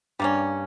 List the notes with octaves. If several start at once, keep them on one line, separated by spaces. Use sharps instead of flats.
G2 G3 A#3 C#4